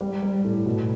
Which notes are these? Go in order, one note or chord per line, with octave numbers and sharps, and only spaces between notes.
G3
G3
A2
B2